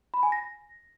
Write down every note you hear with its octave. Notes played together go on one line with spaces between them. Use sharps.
B5
G#5
A#6